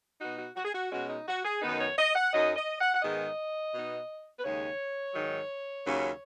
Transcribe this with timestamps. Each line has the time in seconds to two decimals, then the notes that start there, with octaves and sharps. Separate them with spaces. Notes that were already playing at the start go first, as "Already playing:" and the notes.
0.21 B2 B3 D#4 F#4
0.39 F#4
0.56 F#4
0.65 G#4
0.74 F#4
0.92 B2 G#3 C#4 F#4
1.10 D#4
1.27 F#4
1.45 G#4
1.62 F#2 D#3 B3 D#4 B4
1.79 C#5
1.98 D#5
2.15 F#5
2.33 F#2 F#3 D#4 D#5
2.56 D#5
2.80 F#5
2.95 F#5
3.03 G#2 D#3 G#3 B3 D#4 D#5
3.73 B2 B3 D#4
4.39 B4
4.44 D#2 C#3 G#3 C#5
5.14 G#2 D#3 F#3
5.85 D#2 C#3 F#3 C#4